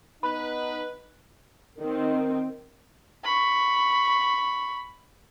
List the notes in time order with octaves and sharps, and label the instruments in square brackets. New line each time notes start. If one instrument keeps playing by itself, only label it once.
[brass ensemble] B3 D#4 [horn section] B4 [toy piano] B5
[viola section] D#3 C4
[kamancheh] B5 C#6